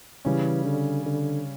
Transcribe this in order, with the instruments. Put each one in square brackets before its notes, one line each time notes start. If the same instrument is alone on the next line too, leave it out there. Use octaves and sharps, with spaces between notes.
[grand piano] C#3 G3 C#4 [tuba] E3
[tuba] D3
D3